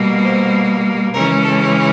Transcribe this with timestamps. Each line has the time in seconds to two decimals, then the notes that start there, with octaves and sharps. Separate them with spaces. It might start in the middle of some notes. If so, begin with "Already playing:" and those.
Already playing: B2 G3 A#3
0.22 C5
1.12 C#3 E3 G#3 C#4 A#4
1.43 A4